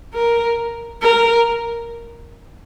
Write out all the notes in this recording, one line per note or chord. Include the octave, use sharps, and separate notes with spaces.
A#4
A#4